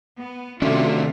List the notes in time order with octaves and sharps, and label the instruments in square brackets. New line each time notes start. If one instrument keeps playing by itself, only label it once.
[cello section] B3
[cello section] C3 F4 E5 [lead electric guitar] D#3 D4 [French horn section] A3 F#4 [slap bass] C#4